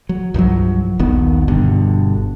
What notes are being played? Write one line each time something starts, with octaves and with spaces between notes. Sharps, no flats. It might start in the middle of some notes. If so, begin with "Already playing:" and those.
F#3
C2 G2 F3 F#3
D#1 A#1 D#3 B3
G1 G2 B2 D3